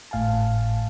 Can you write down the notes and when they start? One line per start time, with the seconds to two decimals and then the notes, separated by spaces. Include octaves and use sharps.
0.11 G#1 A2 F5 G#5 A5